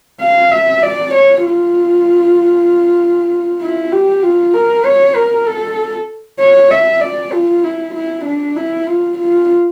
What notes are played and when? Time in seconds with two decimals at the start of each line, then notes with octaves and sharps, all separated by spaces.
0.21 F5
0.51 E5
0.83 D5
1.14 C#5
1.45 F4
3.61 E4
3.92 G4
4.23 F4
4.54 A#4
4.85 C#5
5.16 A#4
5.46 A4
6.40 C#5
6.71 E5
7.01 D5
7.33 F4
7.64 E4
7.95 E4
8.25 D4
8.57 E4
8.87 F4
9.18 F4